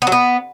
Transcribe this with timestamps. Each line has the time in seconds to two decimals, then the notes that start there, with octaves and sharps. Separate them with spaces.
0.02 B3
0.07 F#3
0.12 B3